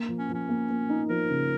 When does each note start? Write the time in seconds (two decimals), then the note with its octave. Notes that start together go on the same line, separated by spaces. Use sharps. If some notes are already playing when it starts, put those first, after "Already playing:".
Already playing: A#3
0.09 F3
0.18 C#4
0.29 F3
0.34 C#4
0.49 A#3
0.70 A#3
0.89 D#4
1.09 F3 A#4
1.30 C#3